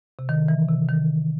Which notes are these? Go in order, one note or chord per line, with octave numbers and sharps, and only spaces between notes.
C3
D#3
E3
C3
D#3